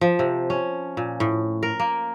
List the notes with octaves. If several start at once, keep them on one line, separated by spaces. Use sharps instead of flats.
F3
C3
C#4
A#2
A2
A#4
A#3